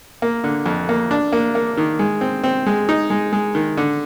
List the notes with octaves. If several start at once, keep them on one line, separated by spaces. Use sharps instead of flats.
A#3
D3
F2
A#3
D4
A#3
A#3
D#3
G#3
C4
C4
G#3
D#4
G#3
G#3
D#3
D3